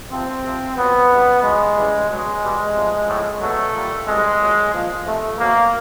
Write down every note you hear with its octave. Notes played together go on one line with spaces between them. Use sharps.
C3 F3 C4
C3 F3
A#2 F#3 B3
C#3 E3 G3
C#3 F#3 G#3
C#3 E3 G3
B2 F#3 G#3
B2 G3
C3 F3
A2 F3
B2 F#3 A3
A#2 G3
C3 E3 G3 G#3
A#2 F#3
A#2 F3
C3 F3 A3
B2 F#3 A#3